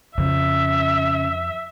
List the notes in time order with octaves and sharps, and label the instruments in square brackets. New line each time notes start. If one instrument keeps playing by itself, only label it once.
[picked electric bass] F2 [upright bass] C#3 [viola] E5